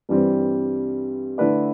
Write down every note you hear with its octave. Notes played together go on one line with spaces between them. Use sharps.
G2 E3 G3 C4
D3 A3 E4 B4 D5